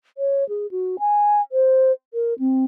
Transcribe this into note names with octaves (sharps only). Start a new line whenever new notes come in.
C#5
G#4
F#4
G#5
C5
A#4
C4